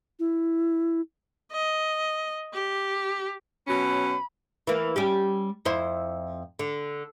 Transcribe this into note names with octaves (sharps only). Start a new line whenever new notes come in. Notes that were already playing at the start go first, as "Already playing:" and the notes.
E4
D#5
G4
B2 F#3 C#4 B5
E3 A#3
G3 C#4 G4
F2 E4 C5
D3